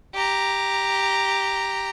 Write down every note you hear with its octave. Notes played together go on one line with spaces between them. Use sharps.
G4 A#5